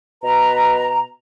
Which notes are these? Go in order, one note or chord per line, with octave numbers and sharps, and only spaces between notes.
B2 B4 A#5